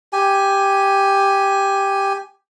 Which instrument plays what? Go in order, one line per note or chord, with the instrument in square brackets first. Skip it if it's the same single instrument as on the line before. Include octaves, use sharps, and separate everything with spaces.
[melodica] G4 G#5